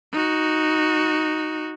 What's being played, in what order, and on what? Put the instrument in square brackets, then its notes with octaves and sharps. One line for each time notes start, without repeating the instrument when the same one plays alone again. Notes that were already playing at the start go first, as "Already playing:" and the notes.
[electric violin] D#4 F#4